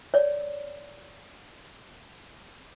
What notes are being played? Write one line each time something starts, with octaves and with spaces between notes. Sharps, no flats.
C#5 D5